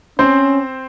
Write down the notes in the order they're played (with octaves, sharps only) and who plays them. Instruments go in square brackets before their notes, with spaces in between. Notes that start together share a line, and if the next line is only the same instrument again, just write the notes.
[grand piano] C4 C5 [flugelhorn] C#4